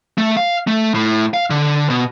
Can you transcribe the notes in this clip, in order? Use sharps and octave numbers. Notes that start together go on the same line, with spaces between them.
A3
F5
A3
A2
F5
D3
B2